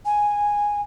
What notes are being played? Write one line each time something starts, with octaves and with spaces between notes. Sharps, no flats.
G#5